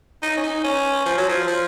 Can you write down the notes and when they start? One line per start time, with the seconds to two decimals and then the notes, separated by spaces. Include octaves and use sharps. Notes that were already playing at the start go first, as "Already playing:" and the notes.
0.23 D#4
0.37 C#4
0.43 D#4
0.64 C#4
1.06 F3
1.18 F#3
1.29 F3
1.47 F3